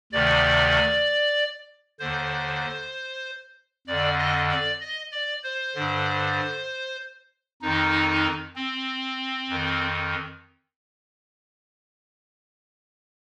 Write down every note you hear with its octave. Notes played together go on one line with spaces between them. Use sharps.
D2 C3 D#3 D5
D#2 D3 C5
F2 D3 D5
D#5
D5
D#5
D5
C5
G2 D3
F2 D#3 D#4
C4
F2 D#3